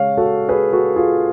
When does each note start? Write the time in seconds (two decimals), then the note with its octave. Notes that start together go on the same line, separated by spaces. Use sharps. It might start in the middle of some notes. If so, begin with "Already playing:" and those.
Already playing: C#3 G#3 C#5 F5
0.17 F#4 A4
0.48 G#4 B4
0.72 F#4 A4
0.96 F4 G#4